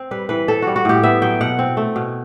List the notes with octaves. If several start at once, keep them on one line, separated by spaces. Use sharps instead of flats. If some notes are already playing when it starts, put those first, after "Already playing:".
Already playing: C4
G3 B4
E3 B4
C4 A4
G3 F#4
F#4
A2 G4
B3 E5
F#3 G5
B2 F#5
C4
A3
B2